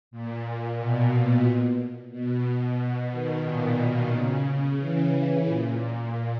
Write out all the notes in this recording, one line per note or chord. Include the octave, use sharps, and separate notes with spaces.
A#2
B2
B2
B2
D#3
A#2
C#3
E3
A#2